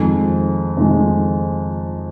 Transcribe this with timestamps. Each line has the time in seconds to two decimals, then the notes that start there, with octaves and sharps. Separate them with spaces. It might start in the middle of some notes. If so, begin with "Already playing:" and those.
Already playing: F2 D#3 G#3
0.77 F2 D#3 G#3